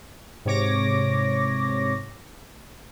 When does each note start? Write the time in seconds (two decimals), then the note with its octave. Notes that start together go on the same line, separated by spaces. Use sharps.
0.45 G#2 C3 C#5 D6 A#6